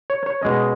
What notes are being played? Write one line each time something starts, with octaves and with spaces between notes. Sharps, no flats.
C#5
C#5
B2 G#3 C#4 D#5